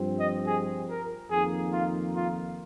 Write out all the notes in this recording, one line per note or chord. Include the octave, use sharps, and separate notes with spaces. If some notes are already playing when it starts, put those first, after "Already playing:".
Already playing: G2 F3 C4
D#5
G#4
A#4
F2 D#3 A#3 D#4 G#4
F4
F4